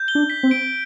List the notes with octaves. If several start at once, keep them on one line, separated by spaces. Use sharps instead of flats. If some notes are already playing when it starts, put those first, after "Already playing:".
Already playing: G6
G7
D4
B6
C4
D7